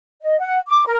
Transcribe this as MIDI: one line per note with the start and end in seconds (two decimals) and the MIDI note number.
0.23 0.38 75
0.39 0.58 78
0.68 0.85 86
0.86 0.97 70